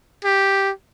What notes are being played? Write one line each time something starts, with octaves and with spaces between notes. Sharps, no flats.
G4